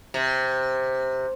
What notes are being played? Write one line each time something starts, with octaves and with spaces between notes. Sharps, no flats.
C3